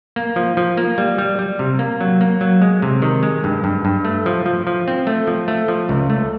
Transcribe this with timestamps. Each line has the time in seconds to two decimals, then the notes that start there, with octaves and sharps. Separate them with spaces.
0.16 A#3
0.36 F3
0.57 F3
0.77 A#3
0.98 G3
1.18 G3
1.39 G3
1.59 C3
1.79 A#3
2.01 F#3
2.21 A#3
2.41 F#3
2.62 G#3
2.82 C3
3.02 D#3
3.23 G#3
3.44 G2
3.64 G2
3.85 G2
4.05 A3
4.26 F3
4.46 F3
4.67 F3
4.88 C4
5.07 A3
5.27 F3
5.48 A3
5.68 F3
5.89 C#2
6.10 A3